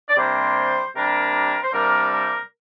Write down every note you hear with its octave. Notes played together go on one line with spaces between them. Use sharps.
D5
C3 G3 A#3 D4 C5
C3 G3 A#3 D4 A#4
C5
C3 G3 A#3 D4 A#4
A#4